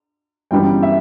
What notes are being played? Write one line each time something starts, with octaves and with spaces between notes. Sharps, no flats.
G1 F#2 E3 G3 B3 G5
E5